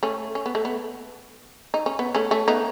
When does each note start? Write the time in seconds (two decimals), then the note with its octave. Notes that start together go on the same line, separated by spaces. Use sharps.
0.03 A3 C#4
0.35 C#4
0.46 B3
0.55 A3
0.65 B3
1.74 D#4
1.86 C#4
1.99 B3
2.15 A3 C#4
2.31 A3 C#4
2.48 B3 D#4